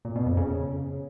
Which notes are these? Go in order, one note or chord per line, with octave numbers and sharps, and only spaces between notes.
A#2
B2
F2
C#3